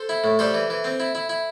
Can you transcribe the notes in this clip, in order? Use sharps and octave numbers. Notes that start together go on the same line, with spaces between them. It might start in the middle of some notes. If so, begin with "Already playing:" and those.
Already playing: A4 C5
E4
A2
G3 A4 C5
E3
E3
C4
E4
E4
E4